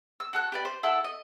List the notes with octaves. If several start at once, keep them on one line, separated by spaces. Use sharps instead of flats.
E6
F#4 A4 F#6
G4 B4 D5
C5
E4 A4 F#5 E6
D#5